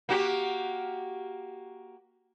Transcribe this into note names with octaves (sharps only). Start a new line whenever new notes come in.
A#3 F#4 G4